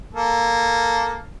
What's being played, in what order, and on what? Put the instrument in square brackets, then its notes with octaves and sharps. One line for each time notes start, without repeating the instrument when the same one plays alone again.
[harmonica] A#3 A4